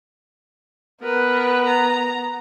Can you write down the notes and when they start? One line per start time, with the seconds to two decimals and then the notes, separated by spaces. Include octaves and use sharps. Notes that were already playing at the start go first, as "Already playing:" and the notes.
1.03 B3 A#4 B4
1.66 A#5